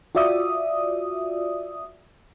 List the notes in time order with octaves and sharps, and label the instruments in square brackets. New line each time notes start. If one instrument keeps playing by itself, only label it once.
[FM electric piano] F4 F#4 D5 E5 D#6